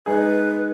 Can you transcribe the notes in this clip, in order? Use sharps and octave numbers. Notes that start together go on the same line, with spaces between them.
G#3 D#4 G#4 B4